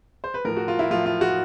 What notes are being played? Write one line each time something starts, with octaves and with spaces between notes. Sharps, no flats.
C5
B4
A2 F3 A#4
F#4
F4
E4
A2 F3 F4
F4
F#4